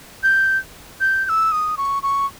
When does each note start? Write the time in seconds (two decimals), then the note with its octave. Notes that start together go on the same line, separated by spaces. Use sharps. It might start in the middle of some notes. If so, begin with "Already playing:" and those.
0.23 G6
1.00 G6
1.26 G6
1.29 E6
1.52 D#6
1.77 C#6
2.03 C#6